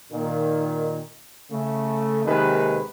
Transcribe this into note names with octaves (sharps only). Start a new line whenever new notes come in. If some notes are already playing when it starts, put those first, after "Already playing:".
A#2 D#3
C#3 A3
D#2 C3 D#3 G#3 B4